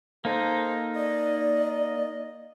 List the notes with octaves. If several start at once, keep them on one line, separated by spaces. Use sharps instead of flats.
A#3 D#4 A4 C5
D5 D#5